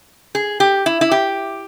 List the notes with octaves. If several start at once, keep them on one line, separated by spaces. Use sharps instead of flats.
G#4
G4
E4
E4
G4